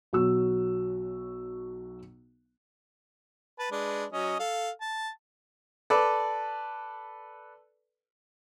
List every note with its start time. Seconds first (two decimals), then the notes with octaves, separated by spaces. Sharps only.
0.13 B1 F#3 F#4 E6
3.59 B4 A5
3.71 G#3 D4 B4
4.13 F#3 C#4 D#5
4.39 A4 F5
4.81 A5
5.90 A4 B4 D5